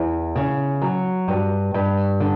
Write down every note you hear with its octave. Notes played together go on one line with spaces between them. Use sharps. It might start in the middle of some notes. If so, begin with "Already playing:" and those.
Already playing: E2 E4
C#3
F#3
G2
G2
D3